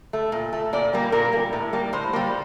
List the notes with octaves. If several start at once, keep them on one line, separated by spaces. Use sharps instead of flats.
A3
A#2
A3
A#2 D5
G3 A#3
A#2 A#4
A#3
G3
A2
G3 A#3
A2 C5
G3 A#3